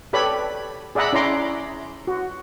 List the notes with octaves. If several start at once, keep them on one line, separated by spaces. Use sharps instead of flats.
G4 A4 B4 C#5 D5 B5
G#4 D5 E5 F#5 A#5 B5
C#4 E4 D5 A#5 C6 D6
F#4